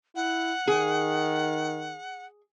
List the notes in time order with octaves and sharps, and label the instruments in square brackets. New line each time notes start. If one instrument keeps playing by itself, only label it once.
[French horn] E4 [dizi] F#5
[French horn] D#3 [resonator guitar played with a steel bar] G#4